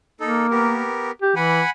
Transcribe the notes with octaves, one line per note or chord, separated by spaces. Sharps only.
A#3 D#4 A4
B3 G4 A#4
G4
E3 F#5 G#5 B5